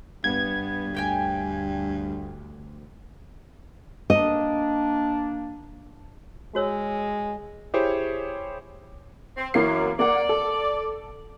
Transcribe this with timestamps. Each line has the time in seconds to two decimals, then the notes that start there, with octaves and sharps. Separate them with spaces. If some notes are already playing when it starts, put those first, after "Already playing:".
0.24 G2 B3 G#6
0.95 D2 G4 G5 G#5
4.10 A#3 D4 D#5
6.55 G#3 F#4 C#5 E6
7.74 E4 G4 G#4 C5 C#5
9.37 C4
9.54 F#2 E3 A#3 C7
9.99 A#3 D5 F#5
10.29 A4